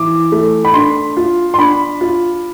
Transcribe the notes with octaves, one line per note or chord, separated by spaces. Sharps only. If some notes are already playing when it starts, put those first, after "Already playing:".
Already playing: E3 D6
A3
B5
D4 C6
F4
C6
D4 B5
F4